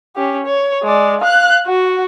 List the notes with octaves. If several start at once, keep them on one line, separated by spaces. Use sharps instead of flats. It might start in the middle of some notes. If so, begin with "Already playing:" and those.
C#4 G4
C#5
G#3 D5
F5 F#6
F#4